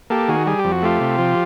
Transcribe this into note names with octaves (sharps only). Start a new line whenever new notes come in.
A#3 G4 A4
D#3 F#4 G#4
G3 G#4
G4
F2
F#4
A3 F4 G4
C3
F3